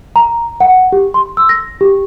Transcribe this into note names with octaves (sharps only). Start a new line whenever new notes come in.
A#5
F#5
G4
C6
E6
A#6
G4